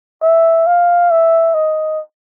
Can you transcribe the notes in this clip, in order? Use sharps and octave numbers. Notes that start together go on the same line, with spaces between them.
E5
F5
E5
D#5